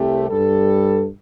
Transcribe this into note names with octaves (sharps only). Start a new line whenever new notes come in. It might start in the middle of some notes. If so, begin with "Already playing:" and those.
Already playing: C2 C3 A3 G4
G2 G3 A4